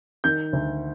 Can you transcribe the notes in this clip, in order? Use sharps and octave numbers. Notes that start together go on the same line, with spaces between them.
D#3 G6
D2